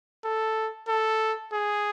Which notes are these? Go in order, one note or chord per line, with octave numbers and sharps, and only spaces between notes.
A4
A4
G#4